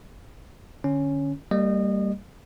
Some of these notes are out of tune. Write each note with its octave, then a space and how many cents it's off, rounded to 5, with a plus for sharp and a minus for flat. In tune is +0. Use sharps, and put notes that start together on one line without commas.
D3 +15 C#4 +0
G3 +0 A#3 -35 D#5 -30